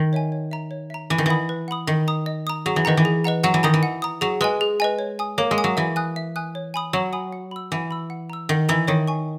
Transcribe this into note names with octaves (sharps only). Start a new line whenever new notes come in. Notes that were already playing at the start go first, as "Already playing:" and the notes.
Already playing: D#3
C#5 E5 G#5
C#5
E5 A#5
C#5
E5 A#5
E3 B4
D#3
E3 F#5 B5 D#6
B4
F#5 B5 D#6
D#3 D#5
A#5 D#6
D#5
A#5 D#6
F#3 G#4
E3
D#3 B4 D#5 F#5 A#5
E3
G#4
B4 D#5 F#5 A#5
F#3 F#5
E3
D#3 A#5 D#6
E3
F#5
A#5 D#6
F#3 G#4
G#3 B4 D#5 G#5
G#4
B4 D#5 G#5
C#5
G#5 D#6
A#3 C#5
G#3
G#5 D#6
F#3
E3 E5
G#5 D#6 F#6
E5
G#5 D#6 F#6
C#5
G#5 B5 D#6
F#3 C#5
G#5 B5 D#6
F#5
B5 E6
E3 F#5
B5 E6
F#5
A#5 E6
D#3 F#5
E3 A#5 E6
D#3 C#5
G#5 C#6